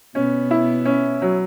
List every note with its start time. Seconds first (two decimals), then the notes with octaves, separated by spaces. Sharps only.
0.15 B2 B3 C#4
0.51 E4
0.85 C#4
1.22 F#3